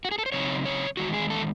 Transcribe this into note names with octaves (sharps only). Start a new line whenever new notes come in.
F#4
G#4
A4
C5
C#3 F#3 C4 D#4 C#5
C#5
E2 D#3 G#3 F#4
G#4
A4